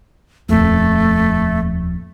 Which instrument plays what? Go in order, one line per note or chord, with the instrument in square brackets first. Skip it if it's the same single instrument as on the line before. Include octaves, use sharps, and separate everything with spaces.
[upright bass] D#1 F2 [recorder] A3